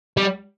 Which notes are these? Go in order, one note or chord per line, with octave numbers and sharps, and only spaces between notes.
G3